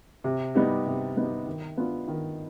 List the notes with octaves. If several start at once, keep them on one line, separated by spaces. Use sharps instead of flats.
C3
G3 B3 D#4 G4
C3
G3 B3 D#4 G4
D#3
B3 D4 F4
D#3